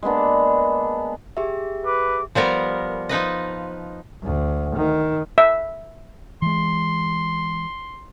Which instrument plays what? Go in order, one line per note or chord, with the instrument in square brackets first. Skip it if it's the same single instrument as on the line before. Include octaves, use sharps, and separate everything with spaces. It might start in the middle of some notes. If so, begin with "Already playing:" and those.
[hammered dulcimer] G#3 A#3 B3 D4
[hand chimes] G4 G#4 E5
[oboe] B4 [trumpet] D6
[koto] F3 G3 B3 A#4
F3 D#4 B4 D#5
[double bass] D2
D#3
[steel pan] E5
[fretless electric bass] E3 G#3 [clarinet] C6